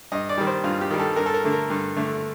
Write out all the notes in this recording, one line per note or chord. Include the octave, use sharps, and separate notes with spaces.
G2 D#5
D5
D#3 G3
C5
G2 F4
G4
D#3 G3
A4
G2 A#4
A4
A#4
D3 A3
A#4
G2
D3 A3